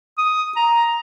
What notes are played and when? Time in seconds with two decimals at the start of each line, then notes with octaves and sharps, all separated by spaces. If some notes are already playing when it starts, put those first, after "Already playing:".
0.18 D#6
0.56 A#5